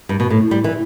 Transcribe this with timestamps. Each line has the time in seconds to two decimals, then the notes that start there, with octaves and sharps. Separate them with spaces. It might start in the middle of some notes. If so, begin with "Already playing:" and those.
0.09 G2
0.20 B2
0.30 A2
0.51 G3
0.64 E3